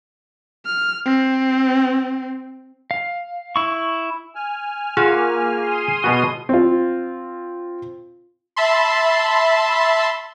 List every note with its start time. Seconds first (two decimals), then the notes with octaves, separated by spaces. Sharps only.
0.66 F6
1.06 C4
2.91 F5
3.56 E4 C#6
4.35 G#5 F6
4.97 A#3 F4 G#4 F5 F#5
5.61 C6 D#6 D#7
6.04 B2 B3 F#4
6.49 C4 F4
8.56 E5 A5 B5 C6